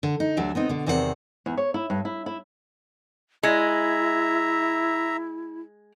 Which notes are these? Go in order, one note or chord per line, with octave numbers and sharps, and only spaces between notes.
D3
D#4
D2 F#3 G3 D4 E5
B3 C4 D#4
B2 D3
E2 C3 D#3 C4 A#4 F#5
E2
C#5
E4
G2
E4
E4
G#3 E4 E5 A#5